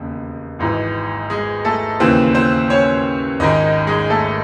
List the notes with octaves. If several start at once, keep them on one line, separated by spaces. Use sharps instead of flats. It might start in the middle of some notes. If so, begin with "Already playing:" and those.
Already playing: E1 D#2 C#3
G#1 G#2 E3
G#3 G#4
A3 A4
D#2 C#3 E3 C4 C5
C4 C5
C#4 C#5
G#1 G#2 D#3 D#4 D#5
G#3 G#4
A3 A4